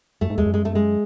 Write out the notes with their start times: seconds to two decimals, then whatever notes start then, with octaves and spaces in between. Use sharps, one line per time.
0.21 F#2 A3
0.30 G#2
0.38 E2 G#3
0.46 F#2
0.54 G#3
0.65 A3
0.75 G#3